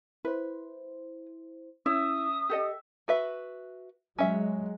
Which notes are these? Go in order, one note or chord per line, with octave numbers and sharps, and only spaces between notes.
E4 B4 C5
C#4 E4 E5 D#6 E6
G4 A4 D#5
F#4 B4 E5
F#3 G#3 C#4 E5